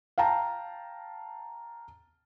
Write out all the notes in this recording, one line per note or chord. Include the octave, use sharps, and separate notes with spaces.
F5 G5 A5 A#5